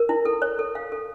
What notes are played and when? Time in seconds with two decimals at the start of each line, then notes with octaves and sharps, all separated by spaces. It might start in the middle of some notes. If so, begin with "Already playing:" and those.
Already playing: A#4
0.09 E4
0.25 A4
0.42 C#5
0.59 A4
0.75 F5
0.92 A4